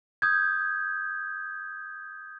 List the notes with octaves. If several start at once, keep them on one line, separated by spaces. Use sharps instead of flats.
D#6 G6 G#6